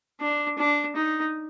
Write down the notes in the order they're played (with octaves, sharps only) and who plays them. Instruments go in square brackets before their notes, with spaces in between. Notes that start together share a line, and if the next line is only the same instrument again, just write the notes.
[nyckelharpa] D4
D4
D#4